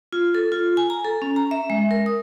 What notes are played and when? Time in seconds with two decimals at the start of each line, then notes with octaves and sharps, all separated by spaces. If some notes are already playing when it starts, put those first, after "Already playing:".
0.13 F4
0.35 A4
0.52 F4
0.77 G#5
0.90 A#5
1.05 A4
1.22 C#4
1.36 A#5
1.51 E5
1.70 G#3
1.91 A#4
2.06 D#6